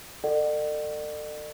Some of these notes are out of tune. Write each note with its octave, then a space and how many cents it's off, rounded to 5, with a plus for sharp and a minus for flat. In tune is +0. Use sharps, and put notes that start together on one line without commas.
A4 +35 D5 +40 F#5 +25